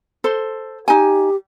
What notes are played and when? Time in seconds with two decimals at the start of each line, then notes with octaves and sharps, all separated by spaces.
0.24 A4 C5
0.88 D#4 G4 G#5